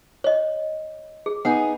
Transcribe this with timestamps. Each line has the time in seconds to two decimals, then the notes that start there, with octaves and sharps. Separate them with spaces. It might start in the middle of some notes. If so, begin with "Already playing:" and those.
0.24 C#5 D#5
1.26 G#4
1.45 B3 D#4 G#4 F#5